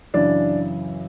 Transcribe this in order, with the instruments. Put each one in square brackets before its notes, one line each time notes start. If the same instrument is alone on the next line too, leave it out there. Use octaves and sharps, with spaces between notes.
[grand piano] F#2 C#3 E3 D4